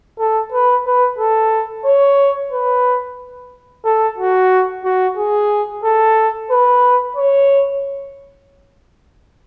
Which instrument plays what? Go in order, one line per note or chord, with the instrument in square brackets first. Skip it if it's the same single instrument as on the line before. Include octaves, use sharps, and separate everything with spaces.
[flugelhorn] A4
B4
B4
A4
C#5
B4
A4
F#4
F#4
G#4
A4
B4
C#5